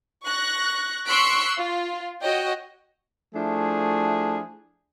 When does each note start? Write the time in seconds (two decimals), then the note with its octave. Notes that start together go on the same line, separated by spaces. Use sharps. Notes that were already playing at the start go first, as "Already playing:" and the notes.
0.25 C#6 F#6 A#6
1.05 C6 C#6 E6 F#6 B6 D7
1.56 F4
2.22 F#4 C#5 D#5 G5
3.34 F3 A3 D4 E4 G#4